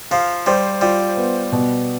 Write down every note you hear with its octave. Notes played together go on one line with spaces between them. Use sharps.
F3 F5
G3 C5
G3 F4
B3
B2